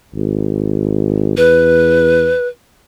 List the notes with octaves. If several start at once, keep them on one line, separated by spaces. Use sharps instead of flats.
G#1
E2 B4